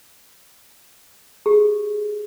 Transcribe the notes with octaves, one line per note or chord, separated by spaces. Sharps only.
G4 G#4